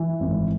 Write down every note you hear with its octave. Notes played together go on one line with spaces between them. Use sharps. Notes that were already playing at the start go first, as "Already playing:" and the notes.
Already playing: E3
G#1